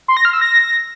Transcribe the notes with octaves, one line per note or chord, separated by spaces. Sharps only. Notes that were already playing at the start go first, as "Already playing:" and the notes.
C6
A#6
F6
E6
A#6